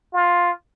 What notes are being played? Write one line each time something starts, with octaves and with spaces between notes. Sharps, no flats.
F4